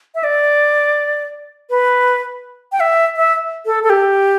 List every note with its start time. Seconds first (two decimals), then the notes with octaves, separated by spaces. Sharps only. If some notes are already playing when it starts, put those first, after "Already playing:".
0.15 E5
0.24 D5
1.70 B4
2.72 G5
2.80 E5
3.16 E5
3.66 A4
3.83 A4
3.90 G4